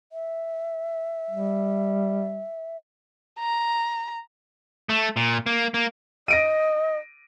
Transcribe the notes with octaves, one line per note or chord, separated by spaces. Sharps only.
E5
G3
A#5
A3
A#2
A#3
A#3
D#5 A#6 D7 D#7